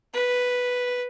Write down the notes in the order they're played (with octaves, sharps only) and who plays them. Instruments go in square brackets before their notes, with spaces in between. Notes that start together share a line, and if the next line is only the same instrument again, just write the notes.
[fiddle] B4